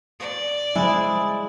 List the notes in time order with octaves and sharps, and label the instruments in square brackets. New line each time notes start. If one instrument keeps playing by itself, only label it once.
[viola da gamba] D5
[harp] G#3 [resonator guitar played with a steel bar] E4